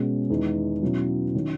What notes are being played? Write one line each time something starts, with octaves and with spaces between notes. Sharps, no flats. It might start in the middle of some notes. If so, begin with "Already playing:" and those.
Already playing: B2 G#3 C#4
E2 D#3 G#3 D#4
B2 F#3 C#4 E4
D#3 F#3 C#4